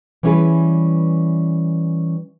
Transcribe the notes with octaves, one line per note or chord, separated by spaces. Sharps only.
E3 G3 C#4 E4 G#4 B4